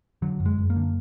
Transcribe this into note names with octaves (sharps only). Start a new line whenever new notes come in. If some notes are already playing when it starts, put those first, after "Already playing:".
D3 F#3
F#2
G#3
F#2
A#3
D3